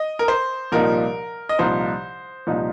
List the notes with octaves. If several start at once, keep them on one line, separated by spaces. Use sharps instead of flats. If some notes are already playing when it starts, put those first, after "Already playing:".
Already playing: D#5
A#4
C5
C2 A#2 F3 D#4 A#4
D#5
C2 A#2 F3 D#4 C5
C2 A#2 F3 D#4